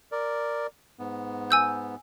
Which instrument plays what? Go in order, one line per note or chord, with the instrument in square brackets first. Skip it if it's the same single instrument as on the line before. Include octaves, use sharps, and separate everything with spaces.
[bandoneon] A#4 D5
G#2 B3
[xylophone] G#5 E6 G6